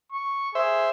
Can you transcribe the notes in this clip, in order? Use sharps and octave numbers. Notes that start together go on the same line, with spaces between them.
C#6
G#4 C5 E5